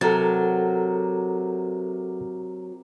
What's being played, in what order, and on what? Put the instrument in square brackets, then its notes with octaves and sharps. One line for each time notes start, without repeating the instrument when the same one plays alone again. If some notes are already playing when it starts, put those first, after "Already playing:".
[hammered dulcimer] C3 A#4 F#5 [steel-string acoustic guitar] F#3 [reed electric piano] A4 A6